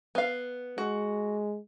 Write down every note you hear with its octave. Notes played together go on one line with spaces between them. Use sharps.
B3 F5
G#3 F#4